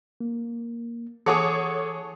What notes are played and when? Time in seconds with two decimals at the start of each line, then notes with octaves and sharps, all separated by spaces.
0.20 A#3
1.26 E3 G#4 A4 C#5 F#5 D6 D#6